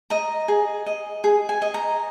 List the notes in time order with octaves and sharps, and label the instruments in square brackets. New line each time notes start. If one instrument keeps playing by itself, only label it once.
[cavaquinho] D#5 A#5
G#4
D#5
G#4
G#5
D#5
A#5